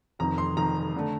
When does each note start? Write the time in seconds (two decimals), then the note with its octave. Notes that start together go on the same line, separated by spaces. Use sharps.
0.19 F1 F2 D#3 A#5
0.38 C6
0.57 F1 F2 D#3 A#5
0.96 D3 A3